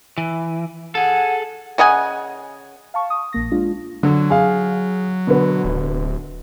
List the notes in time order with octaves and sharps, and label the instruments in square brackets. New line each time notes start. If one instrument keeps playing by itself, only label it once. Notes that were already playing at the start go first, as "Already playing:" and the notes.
[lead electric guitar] E3
[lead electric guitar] G#4 A4 [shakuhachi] F#5
[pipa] C#3 D#5 F#5 G#5
[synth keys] F5 A5 C#6
D#6
A#1 A#3 A#6
G#3 D4 F4
[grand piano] D3 [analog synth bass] F#3
[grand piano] G#4 F5
B2 D3 B3
[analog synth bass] D1